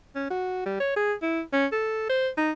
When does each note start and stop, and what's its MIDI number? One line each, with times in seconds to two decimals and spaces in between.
0.15 0.28 61
0.30 0.64 66
0.66 0.75 55
0.80 0.93 73
0.96 1.13 68
1.22 1.41 64
1.53 1.66 61
1.72 2.09 69
2.09 2.29 72
2.37 2.51 63